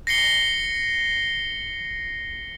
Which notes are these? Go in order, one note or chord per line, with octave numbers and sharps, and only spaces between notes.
A#6 C7 C#7 G7